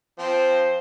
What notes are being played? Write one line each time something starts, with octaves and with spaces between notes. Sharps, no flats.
F3 C4 C5